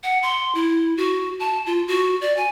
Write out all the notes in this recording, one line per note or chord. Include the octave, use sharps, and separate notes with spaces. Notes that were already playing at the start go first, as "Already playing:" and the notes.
F#5
C6
E4
F#4
A5
F4
F#4
D5
G#5